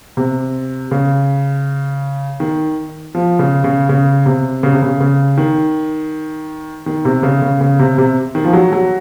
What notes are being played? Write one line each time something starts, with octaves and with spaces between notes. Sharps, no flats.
C3
C#3
D#3
F3
C#3
C#3
C#3
C3
C#3
C3
C#3
C#3
D#3
D#3
C3
C#3
C#3
C#3
C3
C3
D#3
F3
F#3
F#3